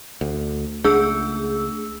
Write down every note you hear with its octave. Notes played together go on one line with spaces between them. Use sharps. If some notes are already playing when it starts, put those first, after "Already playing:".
D2
C#2 A3 D4 G#4 E6